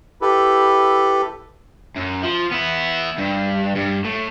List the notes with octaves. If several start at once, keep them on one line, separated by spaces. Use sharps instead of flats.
E4 G4 A4 B4
F#2
F3
B3 E4
G2
G2
A2